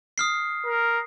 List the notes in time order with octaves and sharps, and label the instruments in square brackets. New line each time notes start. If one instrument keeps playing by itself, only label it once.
[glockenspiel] D#6 F6 C7
[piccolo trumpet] A#4